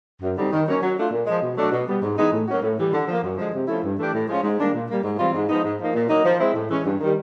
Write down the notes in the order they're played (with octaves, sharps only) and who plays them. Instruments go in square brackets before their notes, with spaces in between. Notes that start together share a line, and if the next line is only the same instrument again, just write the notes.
[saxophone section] F#2
D3 G3 C4 D#4
D#3
F#3 A#3 C#4
F#3
A3 D4 F4
A#2
F3 G#3
B2
F#3 A3 D4 F#4
B2
G3 B3
G#2
E3 G#3 B3 D#4
A2
F#3 A#3 C#4 F#4
A2
E3 G3
D3
F3 A#3
F#2
D3 F3 G#3
C3
F3 A3 C#4 E4
G2
E3 A3 D4 G4
A2
F3 G#3 C#4 F4
G#2
D#3 G3 A#3 D4
A#2
G3 A#3
G#2
E3 G3 C4 F4
G#2
F3 G#3 B3 D#4
G#2
F3 A#3 D#4
A#2
F#3 A#3 D#4
F3
G#3 C4 E4
A2
E3 G#3 C#4
G2
D#3 G3